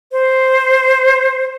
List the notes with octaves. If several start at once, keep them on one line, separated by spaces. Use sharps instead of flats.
C5